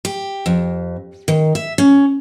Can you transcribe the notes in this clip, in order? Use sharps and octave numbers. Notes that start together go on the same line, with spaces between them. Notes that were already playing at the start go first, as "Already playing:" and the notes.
G4
F2
D#3
E5
C#4